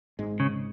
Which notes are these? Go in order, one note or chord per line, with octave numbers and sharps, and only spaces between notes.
G#1 G#2 G#3
C#3